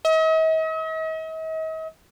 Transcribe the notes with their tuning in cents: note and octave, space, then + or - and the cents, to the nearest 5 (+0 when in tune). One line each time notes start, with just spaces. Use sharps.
D#5 +45